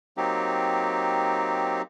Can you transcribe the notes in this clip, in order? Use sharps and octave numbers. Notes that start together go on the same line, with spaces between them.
F#3 A#3 C4 D#4 G4